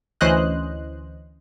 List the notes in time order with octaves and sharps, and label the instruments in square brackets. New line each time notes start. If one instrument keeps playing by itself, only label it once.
[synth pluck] D2 E3 C#4 C5 D#5 F#6